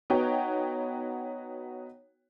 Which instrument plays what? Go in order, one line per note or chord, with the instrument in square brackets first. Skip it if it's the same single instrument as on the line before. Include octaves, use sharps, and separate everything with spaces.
[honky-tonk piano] B3 D#4 F#4 C#5 G5